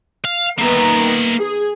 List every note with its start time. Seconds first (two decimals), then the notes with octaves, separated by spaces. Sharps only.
0.25 F5
0.58 D#3 A#3 B3 E5 A#5
1.39 G#4